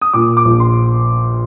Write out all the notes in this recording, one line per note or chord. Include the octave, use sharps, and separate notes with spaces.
D#6
A#2 D6
D6
A#1
C6